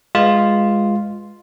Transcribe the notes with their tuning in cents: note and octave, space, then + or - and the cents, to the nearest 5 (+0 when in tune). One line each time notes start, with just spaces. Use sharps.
G#3 -10 F4 +0 B4 -10